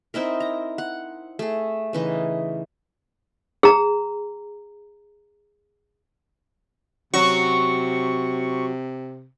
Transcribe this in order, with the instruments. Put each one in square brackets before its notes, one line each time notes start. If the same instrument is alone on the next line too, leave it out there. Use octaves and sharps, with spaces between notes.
[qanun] C4 D#4 E4 A#4
A#5
F#5
A3 G#4
C#3 E3 D#4
[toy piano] G#4 A#5
[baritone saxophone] C3 [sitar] F#3 F#4 [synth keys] C#6